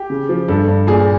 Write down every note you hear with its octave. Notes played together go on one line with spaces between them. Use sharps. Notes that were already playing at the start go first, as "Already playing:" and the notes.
Already playing: G4
C#3
F3
G2 A4
G2
A#2 G#4